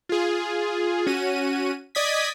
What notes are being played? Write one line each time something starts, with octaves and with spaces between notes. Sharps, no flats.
F4 G#4
C#4 F#4 D#7
D5 D#5 D#6 G#6 B6